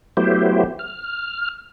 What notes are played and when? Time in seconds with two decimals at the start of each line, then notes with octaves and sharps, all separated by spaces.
0.17 F#3 A3 B3 E4 G4 C5
0.79 F6